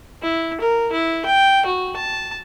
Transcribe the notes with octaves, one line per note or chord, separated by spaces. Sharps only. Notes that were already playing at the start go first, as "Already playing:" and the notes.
E4
A#4
E4
G5
F#4
A5